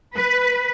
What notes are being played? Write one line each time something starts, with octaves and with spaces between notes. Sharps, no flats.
B4